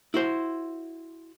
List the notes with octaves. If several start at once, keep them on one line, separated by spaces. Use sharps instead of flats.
E4 F#4 C5